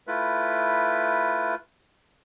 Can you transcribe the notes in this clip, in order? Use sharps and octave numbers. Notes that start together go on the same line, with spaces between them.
A3 E4 F4 B4